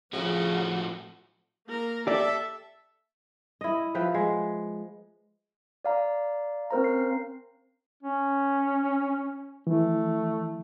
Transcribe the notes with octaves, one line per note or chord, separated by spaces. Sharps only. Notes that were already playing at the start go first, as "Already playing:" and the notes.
A2 C#3 F3 A3 F#4
A#3 A#4
G4 A4 D5 E5
E4 D#5
F3 B4 E5 G5
G#3
D5 F5 A#5
C4 C#4 A#4 C5 F5 A#5
C7
C#4
E3 A3